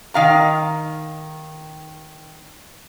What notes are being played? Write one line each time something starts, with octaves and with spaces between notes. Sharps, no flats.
D#3 F5 A#5